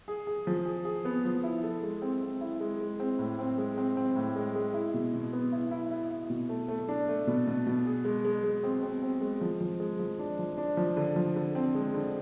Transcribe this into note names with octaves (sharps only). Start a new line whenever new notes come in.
G#4
G#4
F3
G#4
G#4
B3
F3
E4
A4
G#3
C4
C4
E4
G#3
G#3
C4
A2
C4
G#3
C4
C4
A2
G#3
G#3
E4
B2
B2
B3
E4
E4
E4
E4
B2
A3
A3
D4
A3
B2
B2
B2
G#4
G#3
G#3
G#3
C4
C4
C4
G#3
F3
F3
G#3
F3
D4
F3
D4
F3
D3
F3
D3
C4
G#3
D3